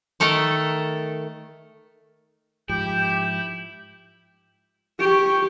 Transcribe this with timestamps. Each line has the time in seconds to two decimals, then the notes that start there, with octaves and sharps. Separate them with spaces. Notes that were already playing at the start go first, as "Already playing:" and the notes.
0.20 D#3 A3 A4 A#4
2.69 G#2 F3 E4 G4 G6
5.00 G4 C#6